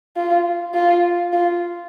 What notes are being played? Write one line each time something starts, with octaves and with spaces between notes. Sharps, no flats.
F4
F4
F4